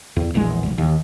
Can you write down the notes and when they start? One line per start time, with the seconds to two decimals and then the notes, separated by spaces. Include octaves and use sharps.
0.16 E2
0.34 E1 A#1 E2 G#3
0.63 F1 A#1
0.78 D#2